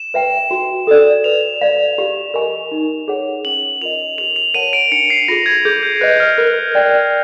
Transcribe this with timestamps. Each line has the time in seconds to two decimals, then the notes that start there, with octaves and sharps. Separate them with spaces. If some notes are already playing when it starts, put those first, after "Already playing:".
Already playing: E7
0.14 B4 E5 G5
0.51 F#4
0.87 A4 D5
1.24 B4 F7
1.61 D5 F5
1.98 G4
2.34 A#4 D#5 G#5 C#6
2.72 D#4
3.08 G#4 C#5 F#5
3.45 C#4 F#7
3.81 F4 A#4 D#5 F7
4.18 G4 F7
4.36 F7
4.54 A#4 C#5 F#5 A5 D#7
4.73 D7
4.92 D4 C#7
5.10 C7
5.28 F4 G#4 A#6
5.46 G#6
5.65 G#4 G6
5.83 G6
6.01 B4 D#5 F#6
6.20 F6
6.38 A#4 F#6
6.75 D5 G5